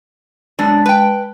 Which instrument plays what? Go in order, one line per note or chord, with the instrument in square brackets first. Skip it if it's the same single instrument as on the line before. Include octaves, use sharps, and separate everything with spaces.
[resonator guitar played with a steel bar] F#2 B2 D4 [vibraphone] G#3 A5
[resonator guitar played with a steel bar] B4 G5